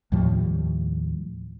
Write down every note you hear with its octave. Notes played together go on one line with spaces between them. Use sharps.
D#2 A2 F3 G3